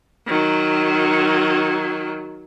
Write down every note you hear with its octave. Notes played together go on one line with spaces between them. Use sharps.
D#3 F#3